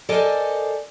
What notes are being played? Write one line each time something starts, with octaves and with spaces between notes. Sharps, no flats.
A4 A#4 C5 D5 D#5 G#5